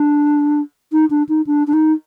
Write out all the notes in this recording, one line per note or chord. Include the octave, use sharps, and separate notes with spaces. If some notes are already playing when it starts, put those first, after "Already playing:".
Already playing: D4
D#4
D4
D#4
D4
D4
D#4